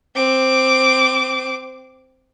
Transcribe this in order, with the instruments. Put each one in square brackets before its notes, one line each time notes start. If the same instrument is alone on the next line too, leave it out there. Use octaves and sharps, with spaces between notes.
[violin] C4 D6